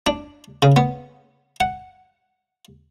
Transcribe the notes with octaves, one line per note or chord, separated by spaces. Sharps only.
D4
C#3
B3
F#5